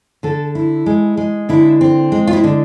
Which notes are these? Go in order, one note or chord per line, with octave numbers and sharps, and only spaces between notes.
D3 A4
E4
G#3
G#3
D3 E4
C4
G#3
F4
E4
D3